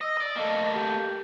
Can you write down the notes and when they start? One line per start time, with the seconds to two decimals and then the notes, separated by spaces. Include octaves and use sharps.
0.01 D#5 E6
0.17 D5 D#5
0.36 A3 A#3 D#5
0.73 G4